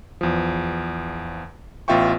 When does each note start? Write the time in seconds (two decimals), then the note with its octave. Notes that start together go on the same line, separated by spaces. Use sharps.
0.21 E2 F3
1.88 A1 B3 F4 E5 G5 C#6